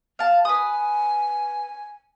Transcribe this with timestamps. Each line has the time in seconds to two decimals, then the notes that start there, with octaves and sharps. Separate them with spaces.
0.19 F5 A5
0.45 B4 G#5 D#6